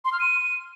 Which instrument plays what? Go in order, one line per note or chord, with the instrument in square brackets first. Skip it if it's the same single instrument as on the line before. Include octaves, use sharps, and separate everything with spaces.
[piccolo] C6
F6
D#7